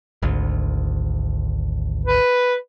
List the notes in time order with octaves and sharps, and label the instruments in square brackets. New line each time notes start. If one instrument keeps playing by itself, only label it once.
[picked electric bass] G#1 D2
[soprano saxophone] B4